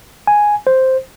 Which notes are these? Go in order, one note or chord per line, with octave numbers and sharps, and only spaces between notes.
G#5
C5